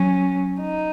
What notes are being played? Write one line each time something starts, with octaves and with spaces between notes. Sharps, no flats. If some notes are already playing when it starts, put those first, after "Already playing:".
Already playing: F#3 C#4
D#4